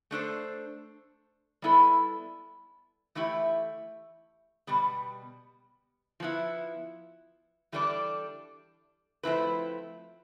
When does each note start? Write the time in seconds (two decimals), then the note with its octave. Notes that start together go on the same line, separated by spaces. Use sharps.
0.11 A3 D4 A4 C5
1.62 G3 B3 E4 A4
3.15 E3 A3 E4 G4
4.67 B2 G3 B3
6.20 F3 B3 E4
7.72 E3 G3 D4 A4 D5
9.23 F3 A3 C4 E4 B4